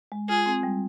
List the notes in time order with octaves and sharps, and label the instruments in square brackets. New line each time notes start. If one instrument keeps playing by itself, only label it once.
[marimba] G#3
[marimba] F4 [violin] G#4
[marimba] C4
G3